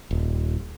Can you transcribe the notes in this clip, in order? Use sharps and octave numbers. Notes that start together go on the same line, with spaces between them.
D#1